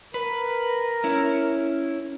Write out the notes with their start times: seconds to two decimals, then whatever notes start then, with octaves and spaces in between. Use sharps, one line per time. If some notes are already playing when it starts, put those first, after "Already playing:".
0.14 A#4 B4
1.04 C#4 E4